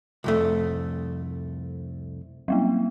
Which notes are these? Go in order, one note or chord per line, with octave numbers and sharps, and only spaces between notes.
C2 F2 A3
F#3 G3 A#3